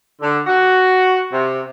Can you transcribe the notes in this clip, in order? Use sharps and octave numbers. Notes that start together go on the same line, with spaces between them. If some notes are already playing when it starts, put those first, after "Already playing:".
D3
F#4
C3